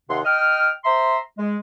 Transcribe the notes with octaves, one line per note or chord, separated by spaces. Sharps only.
D#2 C3 F#5 C6
D#5 G5 F6
C5 E5 A#5 C6
G#3